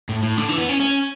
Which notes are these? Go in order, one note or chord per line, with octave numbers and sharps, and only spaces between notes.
A2
A2
D3
E3
B3
C#4
C#4